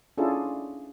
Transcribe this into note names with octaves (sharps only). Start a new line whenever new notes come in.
C#4 D4 E4 F4 G#4 A4